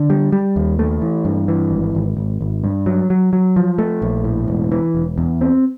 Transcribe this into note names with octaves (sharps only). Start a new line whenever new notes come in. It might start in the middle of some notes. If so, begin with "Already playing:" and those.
Already playing: D3
G3
G3
D#2
A3
E3
G2
E3
G#1
G#1
G#1
G#1
G2
F#3
F#3
F#3
F3
A3
A#1
A2
E1
E3
E1
E2
C4